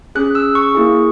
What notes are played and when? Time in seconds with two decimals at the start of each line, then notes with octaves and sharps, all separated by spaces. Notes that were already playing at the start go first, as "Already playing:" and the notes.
0.15 C#4 G#4 F#6
0.35 E6
0.55 C#6
0.75 A#3 E4 G#4